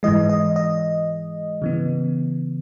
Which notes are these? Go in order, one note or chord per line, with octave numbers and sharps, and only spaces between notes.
G#2 E3 G#3 D#5
D#5
D#5
C#3 E3 B3